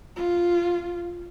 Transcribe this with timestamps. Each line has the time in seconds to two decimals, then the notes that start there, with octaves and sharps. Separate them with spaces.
0.16 F4